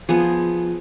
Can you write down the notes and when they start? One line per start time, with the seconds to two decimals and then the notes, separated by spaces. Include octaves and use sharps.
0.09 F3 B3 G#4